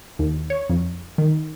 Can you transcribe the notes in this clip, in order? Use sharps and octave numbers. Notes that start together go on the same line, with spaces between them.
D#2
C#5
F2
D#3